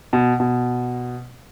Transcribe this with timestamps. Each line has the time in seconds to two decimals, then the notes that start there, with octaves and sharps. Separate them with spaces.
0.13 B2
0.40 B2